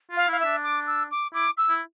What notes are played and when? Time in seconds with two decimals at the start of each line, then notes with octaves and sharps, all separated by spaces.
0.11 F4
0.16 F5
0.28 E4 F5
0.39 E5
0.45 D4
0.63 D6
0.86 E6
1.11 D6
1.33 E4 D6
1.57 E6
1.69 E4